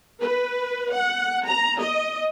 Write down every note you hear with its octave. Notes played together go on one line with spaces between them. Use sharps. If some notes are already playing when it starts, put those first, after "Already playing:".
B4
F#5
A#5
D#5